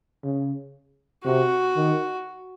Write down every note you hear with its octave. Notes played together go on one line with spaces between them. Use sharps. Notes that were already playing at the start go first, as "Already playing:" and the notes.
C#3
C3 F#4
D#3